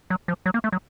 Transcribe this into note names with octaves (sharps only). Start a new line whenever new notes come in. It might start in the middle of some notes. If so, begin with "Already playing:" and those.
F#3
F3
F#3
A#3
A3
F#3